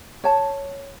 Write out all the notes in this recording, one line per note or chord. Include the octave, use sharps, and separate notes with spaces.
C#5 A5